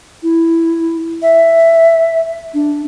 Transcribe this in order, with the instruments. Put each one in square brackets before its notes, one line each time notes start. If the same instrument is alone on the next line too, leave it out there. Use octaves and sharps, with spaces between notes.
[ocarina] E4
E5
D4